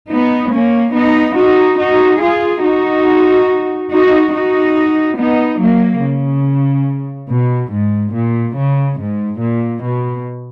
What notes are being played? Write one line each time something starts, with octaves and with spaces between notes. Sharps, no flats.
B3 D#4
A#3 C#4
B3 D#4
D#4 F#4
D#4 F#4
F4 G#4
D#4 F#4
D#4 F#4
D#4 F#4
B3 D#4
F#3 A#3
C#3
B2
G#2
A#2
C#3
G#2
A#2
B2